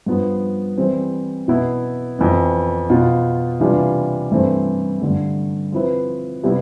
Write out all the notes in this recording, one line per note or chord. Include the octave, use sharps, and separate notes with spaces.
G2 F3 B3
E3 G3 C4
B2 B3 E4
F2 E3 B3
B2 B3 F4
C3 E3 G3 D4 F4
G2 E3 A3 C4
G2 D3 A3
F3 C4 E4 B4
C3 G3 B3 E4